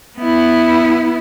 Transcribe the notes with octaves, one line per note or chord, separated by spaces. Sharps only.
B3 E4